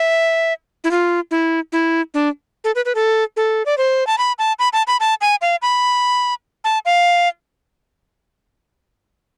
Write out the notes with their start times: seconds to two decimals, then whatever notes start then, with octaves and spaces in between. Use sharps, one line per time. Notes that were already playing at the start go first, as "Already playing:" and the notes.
Already playing: E5
0.84 E4
0.91 F4
1.31 E4
1.72 E4
2.14 D4
2.64 A4
2.75 B4
2.85 B4
2.95 A4
3.37 A4
3.66 D5
3.78 C5
4.07 A5
4.18 B5
4.39 A5
4.59 B5
4.73 A5
4.87 B5
5.00 A5
5.21 G#5
5.41 F5
5.62 B5
6.64 A5
6.85 F5